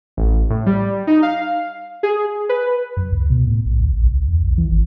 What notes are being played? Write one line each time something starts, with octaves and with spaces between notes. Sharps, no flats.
A1
A2
G3
D#4
F5
G#4
B4
F#2
C#2
B2
A2
B1
D2
A#1
C#2
E2
B1
E3
G#1